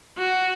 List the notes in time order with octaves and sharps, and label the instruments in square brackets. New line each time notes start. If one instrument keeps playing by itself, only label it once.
[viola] F#4